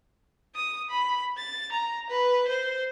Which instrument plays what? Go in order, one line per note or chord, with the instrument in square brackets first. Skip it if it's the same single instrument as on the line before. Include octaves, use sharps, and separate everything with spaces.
[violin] D#6
B5
A6
A#5
B4
C5